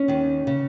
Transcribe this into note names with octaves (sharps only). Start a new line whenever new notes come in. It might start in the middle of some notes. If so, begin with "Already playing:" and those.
Already playing: C#4
D#2 D#3
C#3